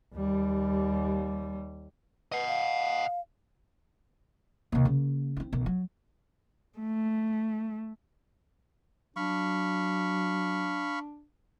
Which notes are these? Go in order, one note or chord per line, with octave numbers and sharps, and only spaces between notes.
D#2 G3
B4 D#5 F#5
F5
D#2 C3
C#3 A#3
C4 E4
B1 D#3
F#3
A3
F#3 D4 F5 B5 C#6